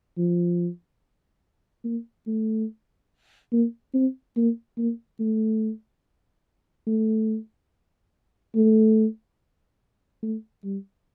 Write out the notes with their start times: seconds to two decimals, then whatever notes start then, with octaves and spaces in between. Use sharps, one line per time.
0.18 F3
1.85 A#3
2.27 A3
3.52 A#3
3.94 C4
4.37 A#3
4.78 A#3
5.20 A3
6.87 A3
8.56 A3
10.23 A3
10.64 G3